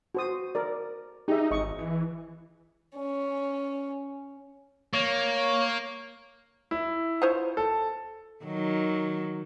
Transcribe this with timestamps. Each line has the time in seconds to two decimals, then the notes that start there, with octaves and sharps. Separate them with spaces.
0.15 F#4 C5 D#6
0.55 A#4 D5
1.28 D#4 G4 G#4 E5
1.51 G#1 D#5 C#6
1.79 E3
2.96 C#4
4.94 A#3 C#5
6.71 E4
7.22 F4 C5 C#5
7.57 A4
8.45 D#3 F#3